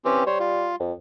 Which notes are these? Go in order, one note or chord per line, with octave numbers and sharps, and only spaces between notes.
E3 C4 C#4 G4
G3 C5 C#5
F4
F2